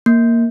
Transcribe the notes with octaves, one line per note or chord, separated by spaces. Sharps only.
A#3